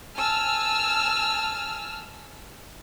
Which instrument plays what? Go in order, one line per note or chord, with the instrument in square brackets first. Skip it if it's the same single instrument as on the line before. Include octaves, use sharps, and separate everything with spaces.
[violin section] G#5 A5 E6 F6